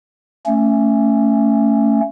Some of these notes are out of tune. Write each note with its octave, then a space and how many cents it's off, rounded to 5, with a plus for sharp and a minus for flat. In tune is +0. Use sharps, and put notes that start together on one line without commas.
A3 +15 C#4 +0